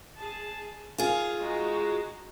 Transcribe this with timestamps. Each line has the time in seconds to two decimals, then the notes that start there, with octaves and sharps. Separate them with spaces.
0.18 G#4 A5
0.98 D#3 F4 G#4 F5
1.39 G#3 D#4 F#4